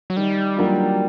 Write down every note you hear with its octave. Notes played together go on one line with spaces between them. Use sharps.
F#3
D#3 G3
F#3 A#3 D4 F4